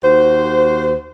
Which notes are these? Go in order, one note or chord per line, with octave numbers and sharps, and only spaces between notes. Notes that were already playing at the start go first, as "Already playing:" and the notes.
D#2 F#4 C5